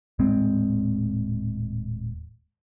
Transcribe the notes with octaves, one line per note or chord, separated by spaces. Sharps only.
D#1 A2 G#3 C4